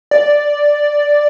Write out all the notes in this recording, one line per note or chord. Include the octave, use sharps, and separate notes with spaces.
D5